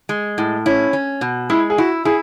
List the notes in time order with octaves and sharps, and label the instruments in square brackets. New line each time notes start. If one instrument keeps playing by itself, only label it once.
[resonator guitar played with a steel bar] G#3
A2
[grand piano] C#4 [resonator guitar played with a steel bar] E4
[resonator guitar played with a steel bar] C#4
B2
[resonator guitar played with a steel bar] G#3 [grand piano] E4
[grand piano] G#4
[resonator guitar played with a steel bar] E4 [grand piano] F#4
[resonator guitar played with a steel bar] E4 [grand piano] G#4